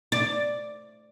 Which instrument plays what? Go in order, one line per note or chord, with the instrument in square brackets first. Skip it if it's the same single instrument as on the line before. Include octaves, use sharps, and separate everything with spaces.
[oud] D5